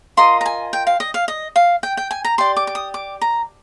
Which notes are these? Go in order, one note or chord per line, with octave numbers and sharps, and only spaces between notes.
F4 A#4 D#5 C6
A#5
G#5
G5
F5
D#5
F5
D#5
F5
G5
G5
G#5
A#5
G4 D5 C6
D6
D6
D#6
D6
A#5